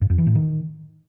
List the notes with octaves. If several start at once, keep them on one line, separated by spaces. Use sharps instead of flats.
G2
F2
E3
A2
D#3